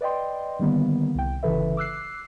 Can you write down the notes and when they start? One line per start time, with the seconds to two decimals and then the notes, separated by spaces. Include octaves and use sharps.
0.01 B4 D5 D#5 G5 C6
0.59 D3 D#3 G3 A#3 B3
1.15 C2 G5
1.43 G1 C#3 E3 A4 B4 E5
1.77 D6 E6 F#6 C7